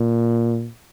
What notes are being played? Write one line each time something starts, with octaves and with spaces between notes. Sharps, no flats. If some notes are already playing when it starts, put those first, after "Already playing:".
Already playing: A#2